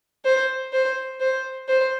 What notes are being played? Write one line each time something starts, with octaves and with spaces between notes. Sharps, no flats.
C5
C5
C5
C5